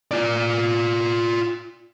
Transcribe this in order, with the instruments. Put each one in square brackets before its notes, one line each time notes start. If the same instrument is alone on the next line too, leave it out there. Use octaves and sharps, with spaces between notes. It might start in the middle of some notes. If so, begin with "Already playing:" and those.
[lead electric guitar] F4 D5